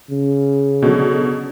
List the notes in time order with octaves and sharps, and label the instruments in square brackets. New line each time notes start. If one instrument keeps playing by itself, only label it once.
[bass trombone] C#3
[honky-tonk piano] B2 D3 F#3